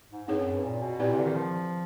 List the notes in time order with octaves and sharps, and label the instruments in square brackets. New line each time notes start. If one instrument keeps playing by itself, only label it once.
[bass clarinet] G#2
[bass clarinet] G2 [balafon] C4 D#4 G#4 C#5
[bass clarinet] F#2
G2
A#2
B2
[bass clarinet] A#2 [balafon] C4 E4 G4 B4 D5
[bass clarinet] C3
D3
D#3
F3